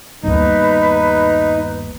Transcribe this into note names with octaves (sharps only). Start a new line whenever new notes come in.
G1 D#2 D#4 B4